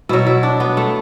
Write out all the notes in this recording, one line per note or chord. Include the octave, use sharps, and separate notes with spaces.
B2 F#3 E4
E4
D4
B3
A3